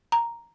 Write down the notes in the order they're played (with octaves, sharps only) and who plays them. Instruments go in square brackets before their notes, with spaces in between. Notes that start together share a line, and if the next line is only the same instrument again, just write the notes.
[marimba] A#5